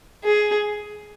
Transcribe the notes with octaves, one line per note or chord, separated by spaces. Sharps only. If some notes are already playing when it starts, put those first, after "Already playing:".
G#4